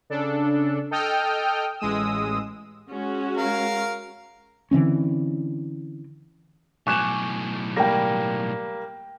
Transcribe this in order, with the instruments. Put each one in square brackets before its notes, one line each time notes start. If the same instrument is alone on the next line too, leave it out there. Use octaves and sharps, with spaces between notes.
[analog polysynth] C#3 D4 A4
A4 D#5 G5 D#6 F6 G6
A1 G#3 D#6 E6
[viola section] G#3 C#4 F#4
[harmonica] A#4 F5
[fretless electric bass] D3 E3 C4 C#4
[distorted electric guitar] B1 A2 [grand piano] G#5 D6 [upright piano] C#6 F#6 E7
[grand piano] G3 A#3 [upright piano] G5 A#6